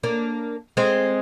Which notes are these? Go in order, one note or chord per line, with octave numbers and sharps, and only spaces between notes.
A#3 D4
G#3 C4